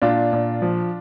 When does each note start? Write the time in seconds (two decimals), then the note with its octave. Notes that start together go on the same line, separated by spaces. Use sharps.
0.02 A#2 D4 F4
0.33 A#2
0.62 F3